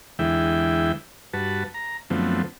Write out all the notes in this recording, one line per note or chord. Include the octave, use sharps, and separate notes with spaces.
E2 D3 E3 G#3 E5 G5
G2 F#4 B4 A5
A#5
F#2 D3 F3 A3 B3 C4